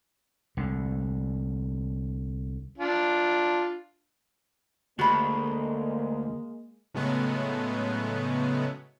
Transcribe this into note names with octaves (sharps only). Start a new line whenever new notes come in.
C2 D3
D4 F4
D2 G#3 A#3 F#4 B5
A2 C#3 F#3 G#3 A3 B3